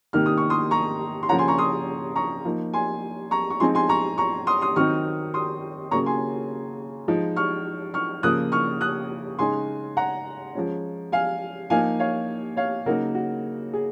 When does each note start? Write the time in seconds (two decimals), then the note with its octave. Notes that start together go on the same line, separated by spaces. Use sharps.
0.13 C3 D#3 A#3 D#4 F6
0.26 D#6
0.38 C#6
0.50 C6 D#6
0.71 A#5 C#6
1.23 C6
1.29 C#3 F3 A#3 C#4 F#5 A#5
1.38 G#5 C6
1.48 A#5 C#6
1.58 C6 D#6
2.16 A#5 C#6
2.45 F3 A#3 D#4
2.73 G#5 C6
3.31 A#5 C#6
3.50 C#6
3.60 F3 G#3 C4 D#4 G#5 C6
3.75 G#5 C6
3.89 A#5 C#6
4.18 A#5 C#6
4.47 C6 D#6
4.61 C6 D#6
4.76 D#3 F#3 C4 D#4 C#6 F6
5.34 C6 D#6
5.91 C#3 F#3 A#3 C#4 A#5 C#6
6.06 G#5 C6
7.08 F3 G#3 D#4
7.36 C#6 F6
7.94 C#6 F6
8.23 C#3 F3 A#3 D#6 F#6
8.52 C#6 F6
8.81 D#6 F#6
9.39 C#3 G#3 D#4 G#5 C6
9.97 F#5 A#5
10.55 F3 G#3 C#4
11.12 F5 G#5
11.70 F3 A#3 D#4 F5 G#5
11.99 C#5 F5
12.57 C#5 F5
12.86 C#3 F#3 A#3 D#4 F#4 A#4
13.15 F#4
13.73 G#4